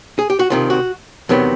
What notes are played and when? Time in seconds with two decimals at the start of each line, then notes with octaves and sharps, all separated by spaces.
0.19 G#4
0.30 G4
0.39 F#4
0.50 C2 C3 D#3 F4
0.70 F#4
1.29 E2 C3 D#3 F#3 B3